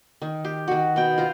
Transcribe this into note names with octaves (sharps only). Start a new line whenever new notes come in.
D#3
G4
D#3 F#4
B2 G5
F4 C5 A#5